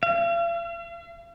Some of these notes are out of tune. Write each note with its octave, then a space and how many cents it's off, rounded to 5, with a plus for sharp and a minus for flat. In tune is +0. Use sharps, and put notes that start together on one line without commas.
F5 -45